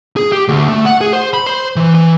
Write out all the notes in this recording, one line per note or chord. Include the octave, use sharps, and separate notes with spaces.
G#4
G4
D2
A3
F#5
G#4
C5
B5
C5
E3
E3